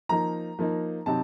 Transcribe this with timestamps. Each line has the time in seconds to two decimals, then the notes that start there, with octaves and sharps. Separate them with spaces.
0.09 F3 A#3 D#4 A#5
0.59 F3 A#3 D#4
1.06 C3 F#3 C4 D#4 A5